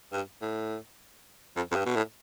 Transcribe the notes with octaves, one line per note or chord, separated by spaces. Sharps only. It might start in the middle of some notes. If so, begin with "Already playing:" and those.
G2
A2
F2
F2
G2
B2
A2